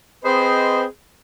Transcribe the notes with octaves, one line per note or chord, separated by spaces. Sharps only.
C4 G#4 B4 C5 D#5